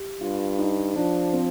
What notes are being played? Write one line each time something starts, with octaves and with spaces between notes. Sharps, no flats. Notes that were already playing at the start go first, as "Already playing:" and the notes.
Already playing: G4
G2 F4
D#4
F3 D4
C4